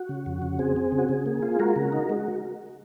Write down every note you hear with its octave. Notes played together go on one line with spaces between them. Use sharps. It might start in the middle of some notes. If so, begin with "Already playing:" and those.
Already playing: F#4
C#3
F2
C#3
C4 G#4
C4
C#3
F#4
C#3 G#4
A#3
F4
G#3 F#4 A#4
C#3
D#4
G#3 F#4